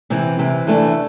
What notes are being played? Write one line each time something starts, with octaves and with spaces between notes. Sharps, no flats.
C3 E3 C4
C3 E3 C4
E3 A3 D4